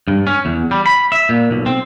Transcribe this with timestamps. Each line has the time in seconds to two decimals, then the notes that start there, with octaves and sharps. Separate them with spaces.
0.08 G2
0.27 C#4
0.45 E2
0.71 G3
0.86 B5
1.12 E5
1.29 A#2
1.51 B1
1.66 C4